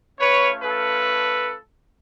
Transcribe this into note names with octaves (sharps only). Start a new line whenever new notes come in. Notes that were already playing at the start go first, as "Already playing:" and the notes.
A3 C#4 F4 B4 C#5
A4 B4